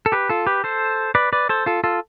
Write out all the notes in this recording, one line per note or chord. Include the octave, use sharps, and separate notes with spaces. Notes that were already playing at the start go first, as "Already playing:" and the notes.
A4
G4 B4
F4 A4
G4 B4
A4 C5
B4 D5
B4 D5
A4 C5
F4 A4
F4 A4